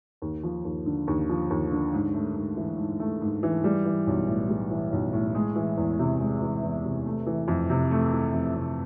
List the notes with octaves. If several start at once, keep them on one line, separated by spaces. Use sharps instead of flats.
D#2
F3
D#2
D3
D#2
F3
D#2
D3
G#2
A3
G#2
E3
G#2
A3
G#2
E3
G3
E3
B1
A2
G3
E3
B1
A2
G#3
E3
E2
C3
G#3
E3
E2
C3
A3
E3
F2
C3
A3
E3
F2
C3